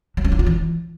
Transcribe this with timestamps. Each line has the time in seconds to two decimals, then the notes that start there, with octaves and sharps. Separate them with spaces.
0.17 F#3
0.25 C#4
0.32 D#4
0.39 F4
0.46 E3